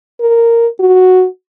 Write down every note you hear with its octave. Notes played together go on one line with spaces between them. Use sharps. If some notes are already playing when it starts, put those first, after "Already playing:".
A#4
F#4